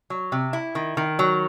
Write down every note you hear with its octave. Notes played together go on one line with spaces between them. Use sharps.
F#3
C3
E4
D#3
D#3
F#3